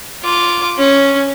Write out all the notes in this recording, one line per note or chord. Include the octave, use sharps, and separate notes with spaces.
F4 D6
C#4